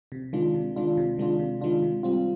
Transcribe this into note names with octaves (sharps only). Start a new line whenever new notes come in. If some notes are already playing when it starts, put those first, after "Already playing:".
C3
D#3 G#3 D4 F4
C3
D#3 G#3 D4 F4
C3
D#3 G#3 D4 F4
C3
D#3 G#3 D4 F4
C3
G3 C4 F4